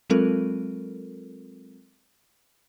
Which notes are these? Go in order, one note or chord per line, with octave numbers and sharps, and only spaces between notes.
F#3 G#3 C4 F4 A4 A#4